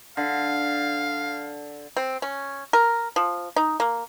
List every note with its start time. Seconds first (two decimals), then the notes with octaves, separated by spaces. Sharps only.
0.17 D3 F5
1.97 C4
2.22 C#4
2.73 A#4
3.16 F3
3.56 D#4
3.80 A#3